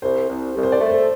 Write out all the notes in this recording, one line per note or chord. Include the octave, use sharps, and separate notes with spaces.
C2 C5
C2
C2
C5
D5
A3
C5